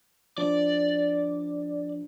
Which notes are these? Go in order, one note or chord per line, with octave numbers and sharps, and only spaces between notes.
F3 D4 D5